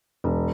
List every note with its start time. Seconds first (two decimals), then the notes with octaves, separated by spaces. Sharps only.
0.24 E1